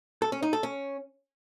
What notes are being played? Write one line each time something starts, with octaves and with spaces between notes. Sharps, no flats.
A4
C#4
D#4
A4
C#4